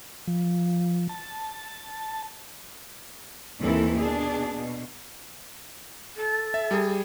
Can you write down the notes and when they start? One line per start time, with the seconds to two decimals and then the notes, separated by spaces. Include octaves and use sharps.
0.27 F3
1.09 A5
3.60 D#2 E3 C4 E4 A4
3.99 B2 D4 G#4
4.56 B2
6.17 A4
6.54 E5
6.71 G3 G#4